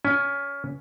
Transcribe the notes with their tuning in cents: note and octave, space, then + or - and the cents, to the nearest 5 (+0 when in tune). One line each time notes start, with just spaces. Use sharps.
C#4 +20 G#5 +0